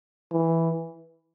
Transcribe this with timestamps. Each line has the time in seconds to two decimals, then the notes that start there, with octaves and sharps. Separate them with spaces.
0.32 E3